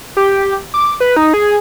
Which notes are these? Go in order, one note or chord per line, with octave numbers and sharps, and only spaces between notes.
G4
D6
B4
D#4
G#4